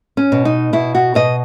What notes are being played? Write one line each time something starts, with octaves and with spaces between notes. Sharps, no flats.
C#4
B2
D#4
B2 E4
F#4
B2 D#5